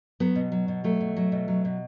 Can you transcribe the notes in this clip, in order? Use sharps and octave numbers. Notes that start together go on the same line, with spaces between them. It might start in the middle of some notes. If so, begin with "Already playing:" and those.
F#3 B3
B2
F#3
B2
F#3 A3
B2
F#3
B2
F#3
B2